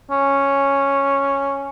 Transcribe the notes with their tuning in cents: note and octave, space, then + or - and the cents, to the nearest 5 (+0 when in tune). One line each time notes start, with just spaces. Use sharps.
C#4 -5